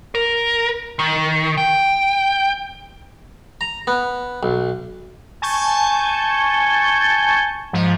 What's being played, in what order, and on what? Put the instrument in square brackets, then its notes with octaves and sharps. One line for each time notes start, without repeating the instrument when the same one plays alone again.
[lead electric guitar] A#4
D#3
G5
[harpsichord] A#5
B3
B1
[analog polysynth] G#5 A5 C#6 G6
G#2 F3